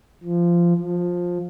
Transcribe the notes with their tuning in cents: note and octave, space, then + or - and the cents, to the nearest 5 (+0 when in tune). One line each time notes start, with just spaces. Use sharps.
F3 -15
F3 +15